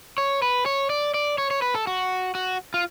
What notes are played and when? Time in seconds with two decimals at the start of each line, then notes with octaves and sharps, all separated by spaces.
0.18 C#5
0.42 B4
0.66 C#5
0.90 D5
1.14 D5
1.38 C#5
1.51 C#5
1.62 B4
1.75 A4
1.87 F#4
2.35 F#4
2.74 F4